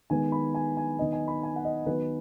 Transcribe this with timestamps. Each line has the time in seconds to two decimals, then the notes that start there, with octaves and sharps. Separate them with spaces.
0.10 D#3 G#3 B3 G#5
0.32 B5
0.55 G#5
0.77 G#5
0.99 D#3 B3 D#5
1.13 G#5
1.28 B5
1.43 G#5
1.56 F#5
1.65 D#5
1.86 D#3 F#3 B3 B4